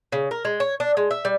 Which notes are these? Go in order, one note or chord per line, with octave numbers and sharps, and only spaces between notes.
C#3
A#4
G#3
C#5
D4
G#3
E5
G3